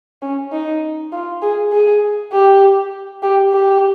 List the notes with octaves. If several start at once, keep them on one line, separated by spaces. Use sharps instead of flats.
C#4
D#4
F4
G#4
G#4
G4
G4
G4